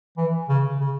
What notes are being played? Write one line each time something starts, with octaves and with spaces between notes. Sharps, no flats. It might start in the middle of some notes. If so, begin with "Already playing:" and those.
E3
C#3
C#3